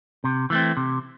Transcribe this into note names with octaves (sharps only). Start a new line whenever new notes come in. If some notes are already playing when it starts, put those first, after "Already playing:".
C3
E3 A3 C4
C3